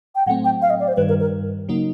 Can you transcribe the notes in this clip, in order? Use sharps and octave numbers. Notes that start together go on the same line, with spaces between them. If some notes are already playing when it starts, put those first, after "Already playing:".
G5
A2 F#3 A3 C4 F#5
G5
F5
D#5
D5
C5
G2 D#3 G3 B4
A#4
A#4
C#3 F#3 A#3 D#4